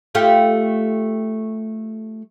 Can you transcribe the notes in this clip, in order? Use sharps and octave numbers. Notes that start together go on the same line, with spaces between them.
A3 F4 G4